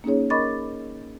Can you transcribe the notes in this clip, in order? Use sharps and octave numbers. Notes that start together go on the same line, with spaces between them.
A#3 C#4 D#4 G#4 C#5
A#4 D#5 B5 C#6 D6 A6